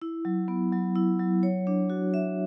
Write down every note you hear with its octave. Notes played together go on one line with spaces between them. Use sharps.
E4
F#3
B3
F#3
E4
F#3
C#5
D4
F#4
E5